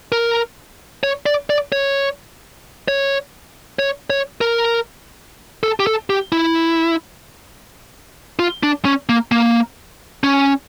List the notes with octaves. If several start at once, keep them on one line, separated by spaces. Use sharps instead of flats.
A#4
C#5
D5
D5
C#5
C#5
C#5
C#5
A#4
A4
G4
A4
G4
E4
F4
D4
C#4
A#3
A#3
C#4